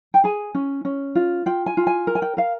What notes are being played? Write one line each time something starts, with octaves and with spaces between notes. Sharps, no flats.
G5
G#4 G#5
C#4
C#4
F4
F4 G5
G#5
F4
G#5
A#4
G#5
G5
A#4 F5